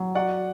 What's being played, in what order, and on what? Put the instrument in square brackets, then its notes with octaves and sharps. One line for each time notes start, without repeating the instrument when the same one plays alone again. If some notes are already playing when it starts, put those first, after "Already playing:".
Already playing: [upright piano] F#3
[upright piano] F#4 [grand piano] D5 F#5